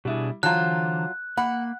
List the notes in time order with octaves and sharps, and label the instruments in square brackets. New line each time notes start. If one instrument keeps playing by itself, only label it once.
[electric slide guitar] B2 D4 G#4 [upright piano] G3 E4
[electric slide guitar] D3 E3 C5 [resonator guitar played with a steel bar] F#3 F4 [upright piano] A5 A#5 [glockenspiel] F#6
[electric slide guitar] A#3 [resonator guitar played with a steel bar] F#5 [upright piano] B5